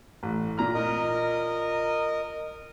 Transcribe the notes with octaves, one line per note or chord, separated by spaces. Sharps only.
A1
A#2 A#5 F6
A#4 D#5